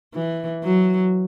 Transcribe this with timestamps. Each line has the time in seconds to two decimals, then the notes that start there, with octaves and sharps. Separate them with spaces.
0.14 E3
0.64 F#3